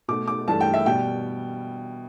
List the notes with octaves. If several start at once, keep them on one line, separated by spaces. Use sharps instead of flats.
B2 A3 D6
D6
G2 E3 A3 A5
G5
E5
B2 G3 G5